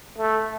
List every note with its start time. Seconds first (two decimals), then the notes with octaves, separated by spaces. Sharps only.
0.18 A3